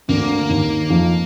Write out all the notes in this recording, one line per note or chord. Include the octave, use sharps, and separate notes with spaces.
D2 D3 A#3
D#2 D#3
F2 F3